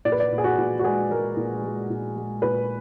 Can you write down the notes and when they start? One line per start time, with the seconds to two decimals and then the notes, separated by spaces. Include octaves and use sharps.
0.05 A#2 D5
0.12 B4
0.20 D5
0.32 A#2
0.38 G#4
0.44 F#4
0.58 A#2
0.79 F#4
0.84 G#3 G#4
1.11 G#3 A#4
1.37 A#2
1.63 G#3
1.90 A#2
2.16 G#3
2.42 A#2 B4